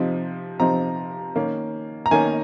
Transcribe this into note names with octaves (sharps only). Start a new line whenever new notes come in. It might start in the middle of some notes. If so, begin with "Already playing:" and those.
Already playing: C3 F3 C4 D#4
C3 F3 C4 D#4 A#5
D#3 A#3 C#4
A#5
D#3 A#3 C#4 G#5